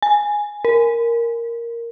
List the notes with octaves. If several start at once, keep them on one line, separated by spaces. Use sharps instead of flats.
G#5
A#4